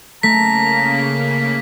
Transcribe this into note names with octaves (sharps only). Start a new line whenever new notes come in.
C#3 A3 A#3 A#5 B6